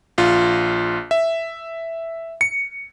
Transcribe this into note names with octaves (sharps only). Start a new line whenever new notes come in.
A#1 F4
E5
C#7